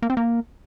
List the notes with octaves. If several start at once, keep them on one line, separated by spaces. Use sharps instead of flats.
A#3
C4
A#3